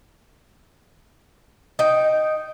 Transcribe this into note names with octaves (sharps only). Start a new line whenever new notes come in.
D#4 G5